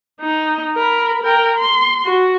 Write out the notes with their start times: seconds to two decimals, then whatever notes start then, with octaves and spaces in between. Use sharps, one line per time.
0.21 D#4
0.75 A#4 B5
1.22 A#4 G5
1.57 C6
2.05 F#4